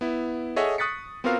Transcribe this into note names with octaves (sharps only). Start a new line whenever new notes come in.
B3 E4
G#4 A4 C#5 D#5 E5 F#5
C#6 D#6 F#6 A6 B6 C#7
B3 C4 F4 F#4 A#4 F5